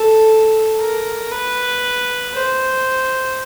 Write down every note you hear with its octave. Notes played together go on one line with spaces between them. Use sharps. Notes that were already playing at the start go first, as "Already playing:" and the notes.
Already playing: A4
A#4
B4
C5